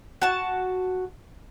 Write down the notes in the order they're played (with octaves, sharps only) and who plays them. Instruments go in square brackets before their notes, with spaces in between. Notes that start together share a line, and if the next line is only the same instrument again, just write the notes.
[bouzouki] F#4 A5